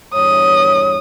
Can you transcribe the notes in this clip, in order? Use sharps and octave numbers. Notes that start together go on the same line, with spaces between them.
E2 G2 C#5 D#6